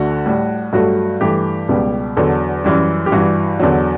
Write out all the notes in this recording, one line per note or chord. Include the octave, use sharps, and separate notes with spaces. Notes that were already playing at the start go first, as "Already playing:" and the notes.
Already playing: D2 D3 A3 F#4
A2 G3
G2 F#3 A3 F#4
G2 E3 A3 G4
C#2 B2 G3
E2 D3 F#3 A4
F#2 E3 G3
G4
G2 E3 G3 F#4
E2 D3 F#3